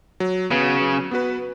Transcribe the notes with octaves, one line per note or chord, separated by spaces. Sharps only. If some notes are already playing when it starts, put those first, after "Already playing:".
F#3
C#3 B3 F#4 B4
F#3
B3 F#4 B4